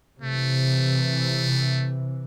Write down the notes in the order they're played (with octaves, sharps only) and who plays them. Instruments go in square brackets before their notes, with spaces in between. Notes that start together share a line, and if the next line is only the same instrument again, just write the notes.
[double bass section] C3 E3 [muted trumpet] A3